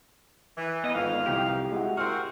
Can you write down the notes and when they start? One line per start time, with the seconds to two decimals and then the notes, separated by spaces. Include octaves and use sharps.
0.57 E3
0.84 D#3 B3 D#4 D#5
0.95 G#1 F2 F5
1.26 C2 G4 G5
1.71 G#3 E4 F#4
1.97 A#3 C4 F#4 C6 F6